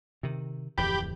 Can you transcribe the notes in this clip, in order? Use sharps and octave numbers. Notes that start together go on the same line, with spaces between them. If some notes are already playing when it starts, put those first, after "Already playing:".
C3 D#3
D1 F2 E3 G4 B5 G6